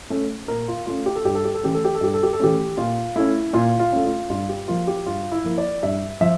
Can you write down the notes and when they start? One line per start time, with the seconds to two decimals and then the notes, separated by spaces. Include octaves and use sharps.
0.10 A3 C#4
0.48 A#2 A#4
0.68 F4
0.86 A3 C#4 F4
1.06 G4
1.15 A4
1.25 G2 G4
1.35 A4
1.44 G4
1.54 A4
1.63 E3 A3 C#4 G4
1.74 A4
1.85 G4
1.94 A4
2.01 G2 G4
2.14 A4
2.23 G4
2.33 A4
2.40 E3 A3 C#4 G4
2.77 A#2 F4
3.16 A3 C#4 E4
3.53 A#2 F4
3.79 F4
3.92 A3 C#4
4.05 F4
4.30 G2 F4
4.49 G4
4.68 F3 A#3 F4
4.87 G4
5.06 G2 F4
5.32 E4
5.44 F3 A#3
5.58 D5
5.83 G2 E5
6.21 F3 E5